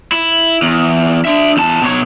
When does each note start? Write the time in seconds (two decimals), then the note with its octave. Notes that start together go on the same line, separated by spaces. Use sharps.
0.12 E4
0.62 E2
1.25 D4 E5
1.57 E2 A5
1.82 B2 C#5